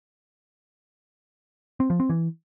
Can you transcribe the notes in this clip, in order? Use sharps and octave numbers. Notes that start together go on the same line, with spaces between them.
C4
F3
C4
E3